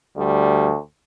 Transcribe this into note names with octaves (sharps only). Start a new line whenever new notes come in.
D2 G3